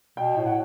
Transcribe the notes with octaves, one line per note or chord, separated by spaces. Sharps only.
B2 G5
A2
F#5